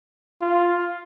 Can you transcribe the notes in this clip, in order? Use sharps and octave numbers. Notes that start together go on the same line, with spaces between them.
F4